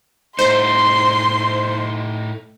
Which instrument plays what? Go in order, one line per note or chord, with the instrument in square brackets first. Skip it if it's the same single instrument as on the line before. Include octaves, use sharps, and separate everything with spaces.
[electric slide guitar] A2 A3 D#4 [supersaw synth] C5 [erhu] C6